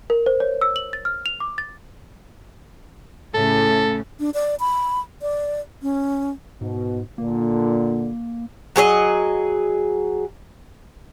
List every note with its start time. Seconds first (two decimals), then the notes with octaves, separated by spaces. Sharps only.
0.10 A#4
0.26 C5
0.40 C#5
0.61 E6
0.76 F#7
0.93 A6
1.05 F6
1.26 F7
1.40 D6
1.58 A6
3.34 A2 C#3 A4
4.20 D4
4.34 D5
4.60 B5
5.22 D5
5.82 C#4
6.61 G#2 B2
7.18 A#2 D3 A#3
8.76 F#3 G#4 C#5 D#5